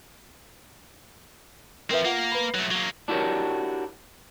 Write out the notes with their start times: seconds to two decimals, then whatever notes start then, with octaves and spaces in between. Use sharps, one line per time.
1.91 F3 C4 A#4 B4 E5
2.05 A#3 F4 F#5
2.31 B4 B5
2.55 F#3 A3 A#6
2.71 F#3 A#3 G7
3.08 D4 E4 F#4 G4 A#4 C#5